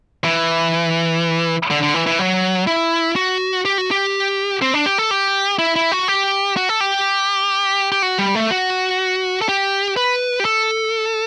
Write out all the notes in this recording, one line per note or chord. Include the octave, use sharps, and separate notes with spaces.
E3
D3
D3
E3
E3
F#3
E4
F#4
G4
F#4
G4
C4
D4
G4
A4
G4
E4
E4
F#4
G4
F#4
A4
G4
G4
F#4
G3
A3
F#4
A4
G4
B4
G4
A4